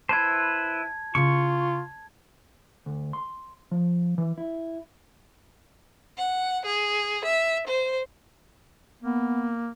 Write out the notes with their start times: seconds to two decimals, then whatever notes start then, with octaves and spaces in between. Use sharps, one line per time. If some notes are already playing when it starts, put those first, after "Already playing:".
0.09 E4 B4 C5 A5 G#6
1.15 C#3 E4 F4 C#6
2.86 D2
3.13 C6
3.71 F3
4.18 E3
4.38 E4
6.18 F#5
6.65 G#4
7.25 E5
7.67 C5
9.03 A#3 B3